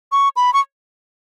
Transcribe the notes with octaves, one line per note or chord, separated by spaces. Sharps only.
C#6
B5
C#6